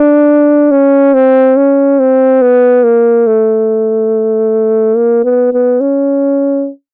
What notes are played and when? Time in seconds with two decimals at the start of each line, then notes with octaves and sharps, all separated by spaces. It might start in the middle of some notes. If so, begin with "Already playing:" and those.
Already playing: D4
0.71 C#4
1.14 C4
1.56 C#4
1.99 C4
2.41 B3
2.84 A#3
3.27 A3
4.96 A#3
5.24 B3
5.53 B3
5.81 C#4